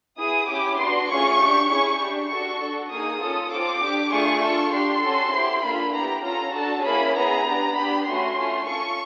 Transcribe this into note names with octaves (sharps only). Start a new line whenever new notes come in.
B3 E4 G#4 D#6
C#4 E4 G4 D6
B3 D4 F#4 C6
A3 C#4 F4 G#4 C#6
D4 G4
C#4 E4 G#4 C#6
D4 G4
D4 F#4 A4 C#6
D4 F#4 A4
A#3 D#4 G#4 D#6
C#4 F4 A4
C4 F4 A4 D6
D4 G4
A3 D4 F4 G#4 C#6
D4 F4 A4
D4 G4 C6
C#4 F#4 A4
C4 E4 G4
A#3 D4 F4 A4 B5
B3 E4 G4 A#5
C#4 F4 A4 A#5
D4 F#4 A4 A5
A#3 C#4 E4 G#4 B5
B3 E4 G#4 A#5
B3 D4 G4
B3 D4 G4 B5
A3 C#4 F#4 C6
A3 C#4 F4
C#4 F4 A4 C#6